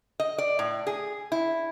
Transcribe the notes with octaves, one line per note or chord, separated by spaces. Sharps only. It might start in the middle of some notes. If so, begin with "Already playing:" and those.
D#5
D5
A2
G#4
E4